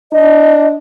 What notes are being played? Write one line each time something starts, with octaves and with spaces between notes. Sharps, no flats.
D4 D#5